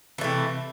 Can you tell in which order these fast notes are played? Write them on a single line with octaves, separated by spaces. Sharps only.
E3 A3 C3